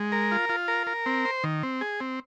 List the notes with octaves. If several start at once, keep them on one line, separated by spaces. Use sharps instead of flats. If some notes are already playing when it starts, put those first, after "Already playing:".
Already playing: G#3
A#4
F4
F4
A#4
A#4
C4
C5
D#3
C4
G#4
C4